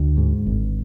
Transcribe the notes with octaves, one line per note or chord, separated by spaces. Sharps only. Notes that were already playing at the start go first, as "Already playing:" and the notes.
Already playing: D2
G#2
G#1